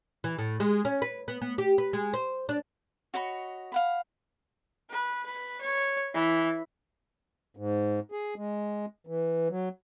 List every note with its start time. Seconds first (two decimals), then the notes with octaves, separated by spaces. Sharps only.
0.24 E3
0.39 A2
0.60 G#3
0.85 C#4
1.02 B4
1.28 B3
1.42 B3
1.58 G4
1.78 B4
1.93 G#3
2.14 C5
2.49 D4
3.14 F#4 C#5 D#5 B5
3.72 F5 F#5 B5
4.90 B4
5.26 B4
5.61 C#5
6.14 E3
7.57 G#2
8.12 G#4
8.36 G#3
9.07 E3
9.50 F#3